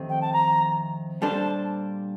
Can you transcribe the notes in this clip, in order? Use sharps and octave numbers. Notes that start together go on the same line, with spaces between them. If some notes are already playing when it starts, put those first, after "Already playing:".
Already playing: F2 D#3 A3 C4 G4
G5
A5
A#5
A#2 G3 D4 A4 C5 A5